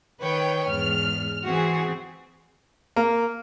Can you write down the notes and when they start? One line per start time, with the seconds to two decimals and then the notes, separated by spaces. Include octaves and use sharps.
0.21 D#3 B4 C#5 G5
0.69 E2 G#2 F6
1.45 E3 C4 F#4 G#4
2.96 A#3